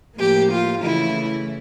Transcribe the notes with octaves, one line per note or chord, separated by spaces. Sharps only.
A2 F3 A#3 G4
F4
C#3 E3 A3 E4